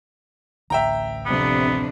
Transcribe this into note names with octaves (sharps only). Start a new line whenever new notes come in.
A1 D2 E5 G5 A#5
F2 C3 B3 D4